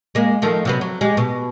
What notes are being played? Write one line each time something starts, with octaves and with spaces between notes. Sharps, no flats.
G#3 A#3
D#3 F3 A3
C3 F#3 B3
F#3
G#3 G4
B2